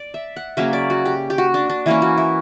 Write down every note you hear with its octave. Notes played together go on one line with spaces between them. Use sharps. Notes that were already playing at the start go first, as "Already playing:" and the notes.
Already playing: D5
E5
F#5
C#3 F#3 A#3 C#4 E5
D5
F#4
G4
G4
F#4
D4
D4
E3 A#3 C#4 E4
F#4
E4